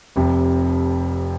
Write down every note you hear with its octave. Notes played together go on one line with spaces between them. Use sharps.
F1 F2 C3